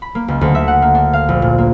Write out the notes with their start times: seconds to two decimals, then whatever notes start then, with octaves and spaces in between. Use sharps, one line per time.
0.02 B5
0.15 A#3
0.28 C#2
0.41 D2
0.55 E5
0.68 F#5
0.82 A#3
0.95 D4
1.13 F5
1.29 A#1
1.42 A#2
1.58 A#3